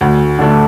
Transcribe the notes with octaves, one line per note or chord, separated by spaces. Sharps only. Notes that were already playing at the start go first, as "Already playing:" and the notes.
D2
D3 A3 D4